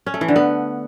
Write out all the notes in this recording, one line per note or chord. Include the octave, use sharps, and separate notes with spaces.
C#4
A3
E3
D3
B3